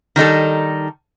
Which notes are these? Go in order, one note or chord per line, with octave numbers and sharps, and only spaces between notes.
D#3 G3 D#4 A4